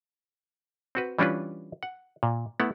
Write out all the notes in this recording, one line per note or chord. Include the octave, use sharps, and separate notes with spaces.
C4 F#4 B4
E3 G3 C#4 D4 F4 B4
F#5
A#2
A3 B3 E4 F#5